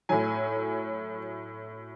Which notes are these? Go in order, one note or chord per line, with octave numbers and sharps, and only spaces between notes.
A2 F#3 G#5